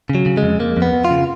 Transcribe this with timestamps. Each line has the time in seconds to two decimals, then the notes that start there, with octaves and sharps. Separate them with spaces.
0.10 C#3
0.15 F#3
0.26 C#3
0.37 G#3
0.43 F2
0.60 F2 A#3
0.77 F2
0.82 B3
0.93 F2
1.05 F4
1.10 C#3